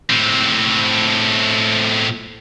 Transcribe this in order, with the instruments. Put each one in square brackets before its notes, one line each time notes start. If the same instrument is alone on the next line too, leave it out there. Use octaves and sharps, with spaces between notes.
[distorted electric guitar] A2 C4